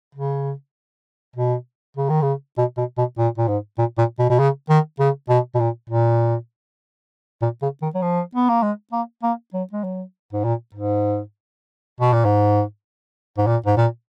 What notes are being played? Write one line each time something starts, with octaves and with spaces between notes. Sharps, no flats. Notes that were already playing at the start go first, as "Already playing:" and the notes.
C#3
B2
C#3
D#3
C#3
B2
B2
B2
A#2
A#2
G#2
A#2
A#2
B2
B2
C#3
D#3
C#3
B2
B2
A#2
A#2
A#2
C#3
D#3
F#3
F3
B3
A#3
G#3
A#3
A#3
F#3
G#3
F#3
G#2
A#2
G#2
B2
A#2
G#2
G#2
A#2
G#2
A#2